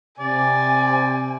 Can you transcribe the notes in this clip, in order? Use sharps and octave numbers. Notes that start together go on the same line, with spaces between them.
C3 D5 G#5